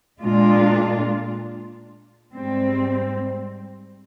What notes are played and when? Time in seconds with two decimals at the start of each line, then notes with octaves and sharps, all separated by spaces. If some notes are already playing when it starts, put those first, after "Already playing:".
0.20 A#2 G#3 D4 F4
2.35 G#2 G3 C4